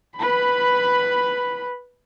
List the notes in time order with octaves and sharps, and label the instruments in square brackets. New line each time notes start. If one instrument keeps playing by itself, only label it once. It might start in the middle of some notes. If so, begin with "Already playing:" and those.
[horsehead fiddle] B4 B5